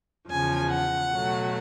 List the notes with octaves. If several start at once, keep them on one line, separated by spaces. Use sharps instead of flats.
E2 C#3 F3 G#5
F#5
B2 F#3 A3